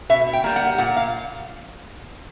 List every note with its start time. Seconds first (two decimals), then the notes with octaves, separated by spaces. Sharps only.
0.09 B2 E5
0.33 G5
0.44 G3 A#3
0.56 F#5
0.78 A#2 F#5
0.97 F5